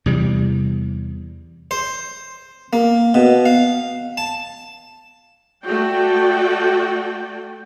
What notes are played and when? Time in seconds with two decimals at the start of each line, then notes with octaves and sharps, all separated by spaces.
0.06 E2 C3 G3
1.71 C5
2.73 A#3
3.14 B2
3.46 F5
4.17 A5
5.64 A3 F#4 D5 G5